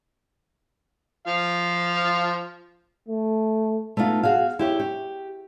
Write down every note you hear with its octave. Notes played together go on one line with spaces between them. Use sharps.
F3 F5
A3
A3 B3 D#4 F4
F#4 G#4 F5
E4 G4 C#5
G4